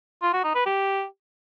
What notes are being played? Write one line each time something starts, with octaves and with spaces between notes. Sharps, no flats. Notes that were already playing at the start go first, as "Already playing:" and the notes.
F4
F#4
D#4
B4
G4